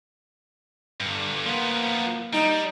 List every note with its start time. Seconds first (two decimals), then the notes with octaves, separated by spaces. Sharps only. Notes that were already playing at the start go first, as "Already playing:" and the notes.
1.00 G2 D3
1.46 F3 A#3 B3
2.33 G3 D#4